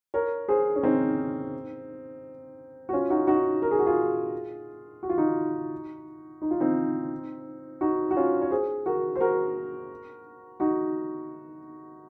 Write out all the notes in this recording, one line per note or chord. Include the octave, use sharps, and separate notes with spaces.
A#4 C#5
G#4 C5
C#4
C4 D#4
F#4
C#4 F4
D#4 F#4
D#4 F#4
A#4
G#4
F#4
F4 G#4
F#4
F4
D#4 F#4
D#4
F4
C4 D#4
D#4 F#4
F#4
C#4 F4
C#5
G#4 C5
F#4 A#4
C5
F#4 A#4
D#4 F#4